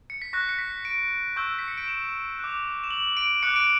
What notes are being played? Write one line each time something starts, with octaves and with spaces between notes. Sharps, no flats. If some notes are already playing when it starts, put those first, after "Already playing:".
C#7
B6
C#6 F#6 A#6
C#7
B6
D7
C#6 E6 G6
B6
C#7
D7
E7
D6 F#6
E7
F#7
D7
D6 F#6 C#7
D7